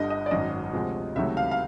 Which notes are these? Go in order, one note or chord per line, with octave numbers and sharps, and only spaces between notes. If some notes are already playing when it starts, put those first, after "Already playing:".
Already playing: G1 G2 D3 G3 D#5
D#5
D5
G#1 F#2 D#3 D#5
D2 C3 F3 G#3
C#2 C3 D#3 F#3 A3 E5
F5
F5